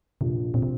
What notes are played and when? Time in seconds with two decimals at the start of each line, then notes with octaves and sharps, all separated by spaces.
0.21 A#1 C3
0.54 A#2 C4
0.63 C3